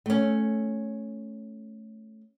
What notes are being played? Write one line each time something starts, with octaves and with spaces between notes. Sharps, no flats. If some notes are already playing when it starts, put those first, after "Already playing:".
A3 C#4